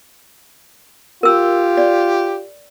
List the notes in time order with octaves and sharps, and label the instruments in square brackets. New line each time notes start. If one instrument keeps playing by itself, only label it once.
[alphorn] F4 [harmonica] G4 [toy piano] A#4 E6
[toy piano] D5